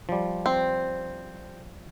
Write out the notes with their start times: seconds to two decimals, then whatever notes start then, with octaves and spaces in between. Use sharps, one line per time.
0.09 F3 G3
0.46 C4